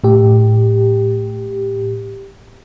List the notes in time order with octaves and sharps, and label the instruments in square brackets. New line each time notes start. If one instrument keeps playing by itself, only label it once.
[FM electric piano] A2 G4